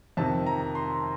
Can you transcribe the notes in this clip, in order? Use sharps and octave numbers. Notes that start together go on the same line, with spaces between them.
F2 C3 D#3 A5
A#5
C6